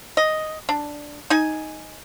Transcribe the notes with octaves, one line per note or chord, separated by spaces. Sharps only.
D#5
D4
D#4 G#5